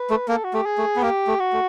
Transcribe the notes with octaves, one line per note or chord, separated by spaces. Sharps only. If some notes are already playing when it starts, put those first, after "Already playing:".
Already playing: B4
A3
A#3 A4
F#4
A3 G4
G#4
A3
B3
A#3 G4
A3
F#4
A3